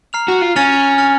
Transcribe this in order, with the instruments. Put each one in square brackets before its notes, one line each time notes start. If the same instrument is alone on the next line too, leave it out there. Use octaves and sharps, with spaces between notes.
[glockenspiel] A#5 F6 C7 F7
[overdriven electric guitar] F#4
F4
[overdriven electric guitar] C#4 [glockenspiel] F6 A6 C#7 F7
[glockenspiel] F6 A6 C#7 F7